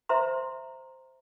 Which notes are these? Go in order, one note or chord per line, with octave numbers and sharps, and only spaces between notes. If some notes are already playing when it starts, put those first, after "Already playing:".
C5 E5 A#5 C6